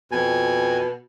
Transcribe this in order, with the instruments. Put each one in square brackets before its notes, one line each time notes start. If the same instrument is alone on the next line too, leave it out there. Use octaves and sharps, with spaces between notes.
[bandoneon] F2 G#5 [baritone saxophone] B2